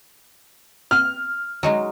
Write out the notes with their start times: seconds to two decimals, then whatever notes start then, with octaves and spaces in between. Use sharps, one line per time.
0.91 F6
1.63 F#3 G#3 D#4